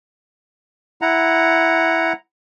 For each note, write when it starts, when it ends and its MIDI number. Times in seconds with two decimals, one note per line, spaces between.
1.02 2.13 64
1.02 2.13 78
1.02 2.13 82